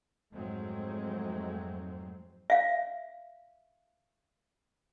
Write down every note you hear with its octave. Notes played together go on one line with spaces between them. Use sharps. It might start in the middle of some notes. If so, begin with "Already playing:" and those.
F2 G#2 F#3 G#3 A3 C4
E5 F5